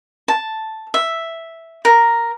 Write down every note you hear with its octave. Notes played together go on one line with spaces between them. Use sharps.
A5
E5
A#4